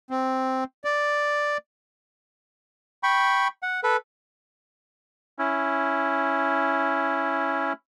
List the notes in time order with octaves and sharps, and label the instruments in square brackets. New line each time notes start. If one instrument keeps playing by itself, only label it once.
[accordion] C4
D5
[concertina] G5 B5 C#6
F#5
A4 B4
C#4 E4